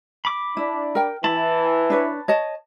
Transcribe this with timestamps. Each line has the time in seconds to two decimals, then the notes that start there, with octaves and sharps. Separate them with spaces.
0.25 B5 D6
0.57 D4 E4
0.95 A#4 G5
1.24 E3 E4 A5 B5
1.90 D4 B4 C#5
2.28 C#5 D#5 A5